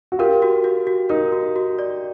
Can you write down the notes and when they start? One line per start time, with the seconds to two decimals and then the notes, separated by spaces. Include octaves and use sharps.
0.12 F#4
0.19 F4 G4 A#4
0.42 F#4
0.64 F#4
0.87 F#4
1.09 D#4 A#4
1.32 F#4
1.56 F#4
1.79 D5